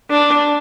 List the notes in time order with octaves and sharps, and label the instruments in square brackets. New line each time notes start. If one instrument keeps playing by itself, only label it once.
[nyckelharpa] D4